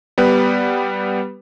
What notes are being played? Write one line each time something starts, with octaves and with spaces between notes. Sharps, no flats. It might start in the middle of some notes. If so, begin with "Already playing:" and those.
G3 B3 G4 B4